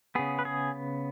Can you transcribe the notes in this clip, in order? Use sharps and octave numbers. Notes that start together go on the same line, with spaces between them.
C#3 B3 G#4
B4
G#4